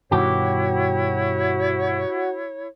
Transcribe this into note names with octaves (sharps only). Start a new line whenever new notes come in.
G2 B2 D#3 E4 F#4 G4 C#5